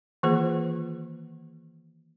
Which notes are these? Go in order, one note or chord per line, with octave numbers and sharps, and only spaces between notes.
D#3 E3 A#3 F4 G#4 C5